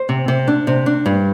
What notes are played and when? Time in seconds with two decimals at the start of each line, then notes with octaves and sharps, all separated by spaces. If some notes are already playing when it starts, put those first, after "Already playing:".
Already playing: C5
0.09 C3
0.28 C3
0.48 D4
0.67 C3
0.86 D4
1.06 G2